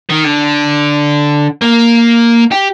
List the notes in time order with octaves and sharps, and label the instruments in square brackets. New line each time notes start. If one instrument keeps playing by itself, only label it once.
[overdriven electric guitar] D#3
D3
A#3
G4